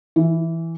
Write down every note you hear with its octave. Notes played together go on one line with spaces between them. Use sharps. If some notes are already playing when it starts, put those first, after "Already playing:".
E3